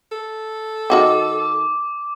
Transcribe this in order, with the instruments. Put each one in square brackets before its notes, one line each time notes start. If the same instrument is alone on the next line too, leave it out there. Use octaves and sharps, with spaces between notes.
[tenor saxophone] A4
[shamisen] D#3 F#4 G5 [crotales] D6